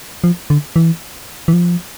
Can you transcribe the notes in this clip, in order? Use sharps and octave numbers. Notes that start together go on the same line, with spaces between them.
F3
D3
E3
E3
F3